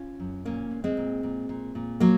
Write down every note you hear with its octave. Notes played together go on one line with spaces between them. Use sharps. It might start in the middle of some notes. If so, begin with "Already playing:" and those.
Already playing: C#4 F4
F#2
A#2 A#3 C#4
A#2
G#3 C4
A#2
A#2
A#2
A#2
F#3 A#3